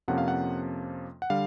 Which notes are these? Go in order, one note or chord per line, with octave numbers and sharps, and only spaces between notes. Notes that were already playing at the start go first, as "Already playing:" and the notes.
F2 C3 F3 A#3 C#4 F#5
F5
F#5
F#5
D3 G3 F5